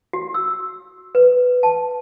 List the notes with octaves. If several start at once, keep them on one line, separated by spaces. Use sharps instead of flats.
F#4
E6
B4
A5